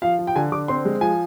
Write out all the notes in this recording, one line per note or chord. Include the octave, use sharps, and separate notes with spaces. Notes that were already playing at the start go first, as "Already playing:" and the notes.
F3 F5
F3
G5
D3 G#5
D3 D6
C4 C6
G#3
F3 G#5